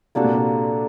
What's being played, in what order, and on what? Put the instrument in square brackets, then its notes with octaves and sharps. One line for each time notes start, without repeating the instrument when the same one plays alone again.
[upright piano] C3 [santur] A#3 D4 F#4 A4
[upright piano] A#2
C3